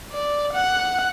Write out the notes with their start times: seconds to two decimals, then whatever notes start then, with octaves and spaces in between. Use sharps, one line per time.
0.12 D5
0.53 F#5